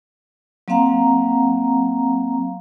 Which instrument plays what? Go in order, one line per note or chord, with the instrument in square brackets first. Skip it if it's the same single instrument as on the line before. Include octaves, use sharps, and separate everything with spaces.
[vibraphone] F#3 A#3 C4 F5 F#5 A#5